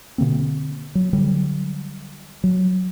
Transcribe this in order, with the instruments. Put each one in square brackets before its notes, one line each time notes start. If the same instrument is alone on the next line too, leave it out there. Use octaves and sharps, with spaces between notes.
[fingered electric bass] B2 D3 A#3 C4
F#3
D3 F#3 G3
F#3